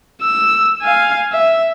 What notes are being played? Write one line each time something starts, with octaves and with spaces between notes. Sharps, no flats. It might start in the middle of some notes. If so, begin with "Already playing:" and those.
E6
F5 G#5
E5